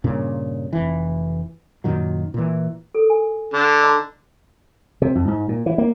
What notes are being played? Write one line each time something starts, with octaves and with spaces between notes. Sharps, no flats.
G2 A#2 C#3 C#4
F1 E3
F#2 A#2 D#3 F#3
A#2 E3
A4 A#4
G#5
D3
D#5 A#5
C3
F2
G#2
A#2
E3
A#3